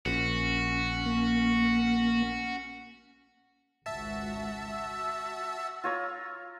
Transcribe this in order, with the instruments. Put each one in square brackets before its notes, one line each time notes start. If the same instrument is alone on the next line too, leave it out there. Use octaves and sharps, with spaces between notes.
[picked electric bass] A#1 [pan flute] C#4 [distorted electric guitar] F#4
[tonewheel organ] A#3
[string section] G#1 C#2 F#4 [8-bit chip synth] E5 A5
[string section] F#4 [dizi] E6
[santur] F4 C#5 A#5